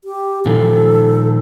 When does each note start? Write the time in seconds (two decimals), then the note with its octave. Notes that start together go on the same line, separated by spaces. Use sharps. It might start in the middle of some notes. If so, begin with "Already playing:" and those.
0.04 G4
0.46 A#2 D#3 F3 A4